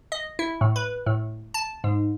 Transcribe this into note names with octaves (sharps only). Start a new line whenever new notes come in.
D#5
E4
A2
B4
A2
A5
G#2